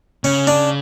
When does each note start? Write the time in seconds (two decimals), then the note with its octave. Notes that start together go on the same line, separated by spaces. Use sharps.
0.24 C#3 C#4
0.47 D4